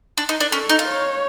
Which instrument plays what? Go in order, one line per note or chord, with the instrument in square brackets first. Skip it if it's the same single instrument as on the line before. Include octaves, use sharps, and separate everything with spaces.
[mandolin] D4
D#4
D4
[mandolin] C#4 [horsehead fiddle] A4
[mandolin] D#4
F4
[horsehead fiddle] C#5